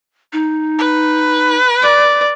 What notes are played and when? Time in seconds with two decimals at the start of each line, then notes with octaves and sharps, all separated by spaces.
0.33 D#4
0.79 B4
1.82 D5